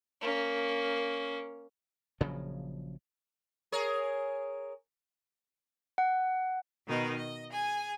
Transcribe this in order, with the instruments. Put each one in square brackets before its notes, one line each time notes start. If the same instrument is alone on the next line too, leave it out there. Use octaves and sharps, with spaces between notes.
[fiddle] A#3 C#4
[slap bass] A#1 C#3 F3 F#3
[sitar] G#4 A#4 C#5
[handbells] F#5
[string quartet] B2 D#3 D#4 B4
D#5
G#4 G#5